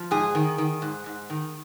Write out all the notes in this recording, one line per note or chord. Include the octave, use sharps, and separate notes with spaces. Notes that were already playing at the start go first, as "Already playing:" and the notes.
Already playing: F3
G#2 G#4
D#3
D#3
G#2
G#2
D#3